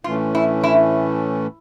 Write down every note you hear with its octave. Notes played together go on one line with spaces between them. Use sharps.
A2 E3 A3 C#4 F4
E4
E4